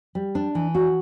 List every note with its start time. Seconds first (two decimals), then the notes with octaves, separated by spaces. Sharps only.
0.15 G3
0.35 D4
0.55 E3
0.75 F#4